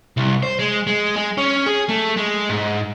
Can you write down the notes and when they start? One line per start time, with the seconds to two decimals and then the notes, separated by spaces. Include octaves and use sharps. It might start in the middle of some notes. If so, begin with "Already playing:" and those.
0.17 C2
0.43 C5
0.59 G#3
0.87 G#3
1.16 G#3
1.38 C#4
1.66 G#4
1.89 A3
2.17 G#3
2.49 G#2